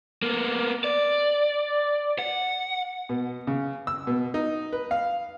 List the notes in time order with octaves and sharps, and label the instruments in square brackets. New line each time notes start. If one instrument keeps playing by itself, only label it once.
[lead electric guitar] A#3 B3
D5
F#5
[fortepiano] B2
C#3
E6
B2
D#4
B4
F5